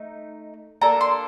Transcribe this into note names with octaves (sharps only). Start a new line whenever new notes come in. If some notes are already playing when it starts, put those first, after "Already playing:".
Already playing: A3 D#4
A#3 D4 A4 A#5
C6